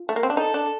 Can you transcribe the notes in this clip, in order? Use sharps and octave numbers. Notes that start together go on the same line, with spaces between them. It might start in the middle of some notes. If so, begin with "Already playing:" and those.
Already playing: F4
A3
A#3
C4
D4
D#4 A4
D4